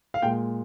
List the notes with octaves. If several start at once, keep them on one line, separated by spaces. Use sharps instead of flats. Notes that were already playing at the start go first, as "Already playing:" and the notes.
F5
A#2 G#3 G5